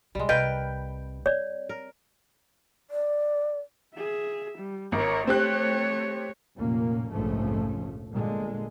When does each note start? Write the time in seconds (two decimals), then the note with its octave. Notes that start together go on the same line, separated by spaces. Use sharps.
0.15 C2 G3 G#3
0.29 C2 C3 A#4 B4 D#5 F5 G5
1.26 C4 C#5 D5
1.69 A#4
2.91 D5
3.95 G#4 E5
4.59 G3
4.92 G#1 A#4 C#5
5.27 A3 C4 G4 C#5 F#6
6.58 F1 A#2 A#3 C#4
7.09 F1 A#1 G#2 F3 A3 C#4
8.11 G1 A#2 D3 G#3